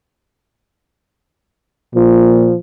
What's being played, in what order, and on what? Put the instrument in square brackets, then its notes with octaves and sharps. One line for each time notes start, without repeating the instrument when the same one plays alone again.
[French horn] A#2 [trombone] F3